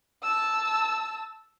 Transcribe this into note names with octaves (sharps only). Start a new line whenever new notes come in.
A5 E6